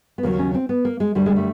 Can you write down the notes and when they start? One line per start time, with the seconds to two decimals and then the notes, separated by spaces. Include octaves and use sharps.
0.18 B3
0.23 D#2 C#3 F#3 A#3
0.39 C#4
0.54 C4
0.69 B3
0.85 A#3
1.00 G#3
1.15 F#2 D3 G3 A3
1.26 G#3
1.36 A3